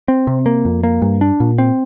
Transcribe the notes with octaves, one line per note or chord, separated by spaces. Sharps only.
C4
C3
A#3
F2
A#3
G2
D4
A#2
C4